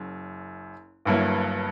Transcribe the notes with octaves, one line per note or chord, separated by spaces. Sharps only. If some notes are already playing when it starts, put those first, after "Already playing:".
Already playing: F#1 F#2
G1 G2 F#3 A#3 E4